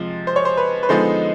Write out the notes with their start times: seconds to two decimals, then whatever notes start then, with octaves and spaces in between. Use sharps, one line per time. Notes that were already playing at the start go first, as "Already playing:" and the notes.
Already playing: C3 F3 G#3
0.27 C5
0.36 C#5
0.45 C5
0.57 B4
0.83 B4
0.89 D3 F3 G#3 B3 D#4 C5